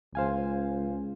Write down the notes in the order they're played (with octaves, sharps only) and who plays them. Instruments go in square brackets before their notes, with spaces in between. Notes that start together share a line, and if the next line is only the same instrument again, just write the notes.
[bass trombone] C#2 [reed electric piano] C5 F5 G#5